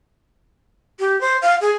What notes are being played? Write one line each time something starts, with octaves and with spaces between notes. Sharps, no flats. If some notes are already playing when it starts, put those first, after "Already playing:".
G4
C5
F5
G#4